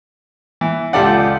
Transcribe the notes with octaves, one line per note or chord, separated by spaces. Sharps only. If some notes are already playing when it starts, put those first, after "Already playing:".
E3
C#2 F4 G4 A4 D5 F#5